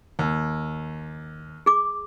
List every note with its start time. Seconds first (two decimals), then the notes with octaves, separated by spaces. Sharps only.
0.19 D#2
1.66 G#4 D6